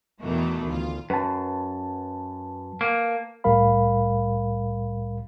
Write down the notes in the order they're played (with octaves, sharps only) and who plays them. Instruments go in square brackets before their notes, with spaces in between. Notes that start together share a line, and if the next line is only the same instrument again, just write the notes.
[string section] E2 B2 D#3 E3 A3
D2 F4
[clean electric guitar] F#2 [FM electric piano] B4 A5
[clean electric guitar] A#3
[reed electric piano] C2 A2 G3 A#4 F5 B5